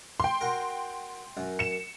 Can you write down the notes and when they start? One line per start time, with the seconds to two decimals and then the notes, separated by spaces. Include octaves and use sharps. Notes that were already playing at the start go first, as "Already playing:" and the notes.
0.20 G5 C6
0.41 F#4 A#4
1.37 F#2
1.59 C#7 E7